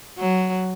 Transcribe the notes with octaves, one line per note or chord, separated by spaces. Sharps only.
F#3